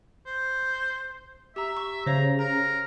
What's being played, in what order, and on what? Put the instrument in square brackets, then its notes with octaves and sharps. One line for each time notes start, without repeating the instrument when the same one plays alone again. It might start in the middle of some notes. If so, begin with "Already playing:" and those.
[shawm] C5
[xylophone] G4 A#5 [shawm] E5
[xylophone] C#6
[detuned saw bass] C#3 [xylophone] C5 C#5 F5 [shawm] A#5
[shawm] A#4 [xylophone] A#5